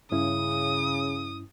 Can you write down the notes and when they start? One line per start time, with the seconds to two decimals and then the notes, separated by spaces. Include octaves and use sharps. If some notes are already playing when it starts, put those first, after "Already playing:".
0.12 G2 C#3 C#4 E4 D#6